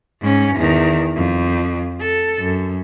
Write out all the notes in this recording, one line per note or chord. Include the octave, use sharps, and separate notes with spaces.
G#2 C#4
E2 D#3
F2
A4
F#2